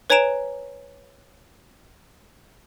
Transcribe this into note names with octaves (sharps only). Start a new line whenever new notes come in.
B4 C#5 G#5 A#5 D7 E7